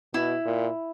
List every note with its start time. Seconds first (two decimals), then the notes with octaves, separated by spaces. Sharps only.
0.14 B2 E4
0.45 A#2